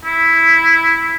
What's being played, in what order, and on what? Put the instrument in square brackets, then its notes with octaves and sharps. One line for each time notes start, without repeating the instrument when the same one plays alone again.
[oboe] E4